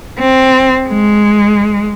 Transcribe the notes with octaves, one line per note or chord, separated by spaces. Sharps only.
C4
G#3